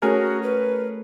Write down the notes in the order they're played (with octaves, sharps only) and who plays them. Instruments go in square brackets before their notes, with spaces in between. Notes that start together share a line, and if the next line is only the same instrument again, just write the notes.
[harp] A3 [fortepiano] C#4 G#4 A#4 [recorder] F#4
[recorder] B4